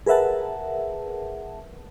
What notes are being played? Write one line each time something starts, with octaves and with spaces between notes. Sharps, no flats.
G#4 A#4 B4 E5 F#5 A5